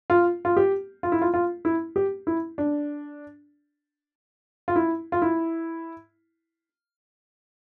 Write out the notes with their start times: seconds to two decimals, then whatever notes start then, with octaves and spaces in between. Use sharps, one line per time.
0.10 F4
0.45 F4
0.57 G4
1.03 F4
1.12 E4
1.22 F4
1.34 F4
1.65 E4
1.96 G4
2.27 E4
2.58 D4
4.68 F4
4.76 E4
5.12 F4
5.22 E4